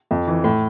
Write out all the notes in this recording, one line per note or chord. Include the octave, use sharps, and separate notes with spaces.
F2
E3
A2